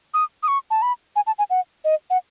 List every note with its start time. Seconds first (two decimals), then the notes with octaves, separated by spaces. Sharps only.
0.14 D#6
0.43 D#6
0.48 C#6
0.71 A5
0.82 B5
1.16 G#5
1.27 A5
1.38 G#5
1.50 F#5
1.84 D#5
2.10 F#5